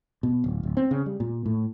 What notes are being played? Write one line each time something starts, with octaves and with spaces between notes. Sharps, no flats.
B2
D1
D1
C4
C#3
G3
A#2
A2